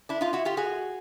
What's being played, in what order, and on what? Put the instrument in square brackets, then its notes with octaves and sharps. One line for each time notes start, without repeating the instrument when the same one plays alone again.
[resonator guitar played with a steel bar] D4 E4
D#4 F4
E4 F#4
F4 G4
F#4 G#4